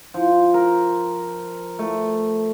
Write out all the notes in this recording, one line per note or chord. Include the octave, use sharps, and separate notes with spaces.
F3
A#4
A3